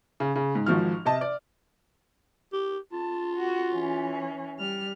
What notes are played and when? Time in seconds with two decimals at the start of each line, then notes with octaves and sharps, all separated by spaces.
0.20 C#3
0.35 C#3
0.55 G#2
0.66 G#1 G#2 F3 F#4 F6
1.05 C3 D#5 A5
1.21 D5
2.53 G4
2.93 F4 A5
3.36 F#4
3.71 E3 C#4
4.58 G3 F6